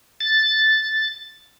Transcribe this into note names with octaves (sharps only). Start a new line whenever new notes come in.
A6